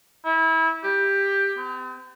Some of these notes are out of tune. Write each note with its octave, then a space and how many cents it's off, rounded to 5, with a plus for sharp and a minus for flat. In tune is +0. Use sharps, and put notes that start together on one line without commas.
E4 -25
G4 +10
C4 -45